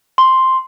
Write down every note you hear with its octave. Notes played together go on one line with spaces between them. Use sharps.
C6